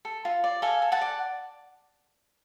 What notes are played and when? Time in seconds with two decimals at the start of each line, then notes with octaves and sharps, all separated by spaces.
0.05 A4
0.25 F4
0.44 D5
0.62 A4 F5 G#5
0.82 A4
0.92 F#5 A5
1.01 D5